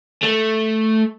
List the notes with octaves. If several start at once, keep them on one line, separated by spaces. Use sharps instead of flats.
A3